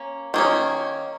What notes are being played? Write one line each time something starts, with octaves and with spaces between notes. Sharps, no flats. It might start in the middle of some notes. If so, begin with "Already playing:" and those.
Already playing: A#3 C#4
D#3 A#3 C#4